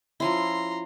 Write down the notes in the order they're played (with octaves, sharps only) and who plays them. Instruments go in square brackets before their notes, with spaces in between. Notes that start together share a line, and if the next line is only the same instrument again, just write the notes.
[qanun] F3 C#4 E4 [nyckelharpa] A#5 C6